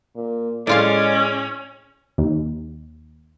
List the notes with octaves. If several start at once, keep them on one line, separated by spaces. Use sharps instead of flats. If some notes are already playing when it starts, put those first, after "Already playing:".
A#2
A2 G#3 C#4 F4 D5 F5
D#2